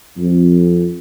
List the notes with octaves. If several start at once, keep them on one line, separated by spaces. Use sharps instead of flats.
F2